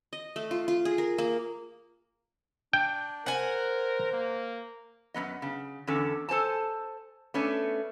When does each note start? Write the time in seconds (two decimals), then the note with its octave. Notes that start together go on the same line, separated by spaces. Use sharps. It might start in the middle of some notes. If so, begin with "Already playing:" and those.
0.13 D#5
0.36 A3
0.51 F4
0.68 F4
0.85 G#4
0.98 A#4
1.18 A#3
2.73 D4 G5
3.26 A#4 C5 F#5 G#5
4.12 A#3
5.14 F#2 G3 B3 D#5
5.42 C#3
5.87 E2 D3 C#4 A4
6.29 A4 C5 G#5 A5
7.34 A3 B3 C#4 D4